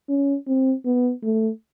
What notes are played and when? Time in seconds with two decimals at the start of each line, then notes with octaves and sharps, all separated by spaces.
0.09 C#4
0.47 C4
0.85 B3
1.23 A3